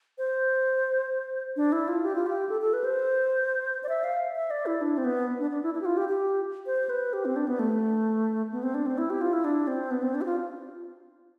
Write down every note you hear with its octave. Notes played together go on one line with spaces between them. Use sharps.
C5
D4
E4
F4
G4
F4
G4
A4
A4
B4
C5
D5
E5
F5
E5
D5
E4
D4
C4
B3
D4
D4
E4
E4
G4
F4
G4
G4
C5
B4
G4
C4
D4
B3
A3
B3
C4
D4
C4
E4
G4
F4
E4
D4
C4
B3
C4
D4
G4
F4